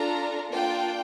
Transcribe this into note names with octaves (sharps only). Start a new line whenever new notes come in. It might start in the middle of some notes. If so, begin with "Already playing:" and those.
Already playing: D4 F4 A4 A#5
A#3 D4 F4 G5